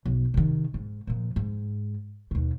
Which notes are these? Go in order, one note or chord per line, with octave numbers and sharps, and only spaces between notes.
B1
C3 D#3
G#2
F2 A#2
G#2
D#2 B2